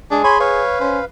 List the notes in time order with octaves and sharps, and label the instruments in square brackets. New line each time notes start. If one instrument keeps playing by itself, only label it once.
[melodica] G#3 [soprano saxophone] D4 [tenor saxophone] G#4
[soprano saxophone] C#5 [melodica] G#5 B5 C6
[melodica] B4 F5 [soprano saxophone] C#5
[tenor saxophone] C#4 [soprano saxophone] C5